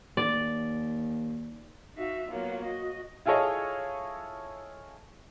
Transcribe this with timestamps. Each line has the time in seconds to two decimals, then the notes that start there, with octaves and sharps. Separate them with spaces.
0.17 D#2 D5
1.94 D#4 F#4 E5 F5
2.28 F#3 A#3 B3 F4
2.63 F#4 D#5
3.25 E4 F4 G#4 A4 C#5 D#5